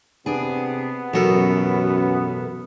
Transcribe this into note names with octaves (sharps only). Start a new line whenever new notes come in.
C3 B3 D4 G#4
A1 F#2 B2 F#3 A4 A#4